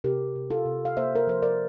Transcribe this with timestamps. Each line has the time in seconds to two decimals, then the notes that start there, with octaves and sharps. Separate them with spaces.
0.04 C3 G4 A#4
0.35 C3
0.50 F4 A4
0.66 C3
0.85 F5
0.96 A#3 C5 E5
1.15 A#4
1.27 F3 C5
1.42 A#4 D5